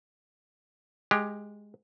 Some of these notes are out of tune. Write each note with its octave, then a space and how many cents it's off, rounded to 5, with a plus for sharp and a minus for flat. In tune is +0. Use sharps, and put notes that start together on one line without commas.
G#3 +0 G4 +15